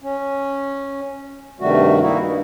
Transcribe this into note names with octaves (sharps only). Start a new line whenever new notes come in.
C#4
G2 C3 D#3 G3 A3 F#4
G3 A#3 D#4 E4 F#4
G2